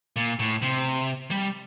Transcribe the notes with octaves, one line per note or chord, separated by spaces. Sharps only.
A#2
A2
C3
G3